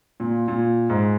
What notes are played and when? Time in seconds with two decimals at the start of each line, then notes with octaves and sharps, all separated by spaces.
0.20 A#2
0.48 A#2
0.90 G#2